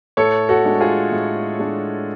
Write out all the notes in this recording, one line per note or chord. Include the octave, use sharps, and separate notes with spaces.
A2 A4 C#5
F#4 A4
G#3 D4
F4 G#4
A2
G#3 D4